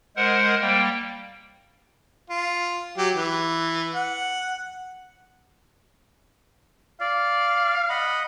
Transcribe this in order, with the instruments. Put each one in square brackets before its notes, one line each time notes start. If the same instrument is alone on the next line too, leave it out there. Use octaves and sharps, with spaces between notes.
[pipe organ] G#3 A#4 C5 F#5
G3 A#3 G5
[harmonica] F4
F#3 G4
E3
F#5
[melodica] D5 [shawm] F5
[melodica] D#5 F#5 B5